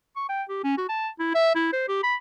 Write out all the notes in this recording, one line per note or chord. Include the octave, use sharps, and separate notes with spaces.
C#6
G5
G4
C#4
F#4
A5
E4
E5
E4
C5
G4
B5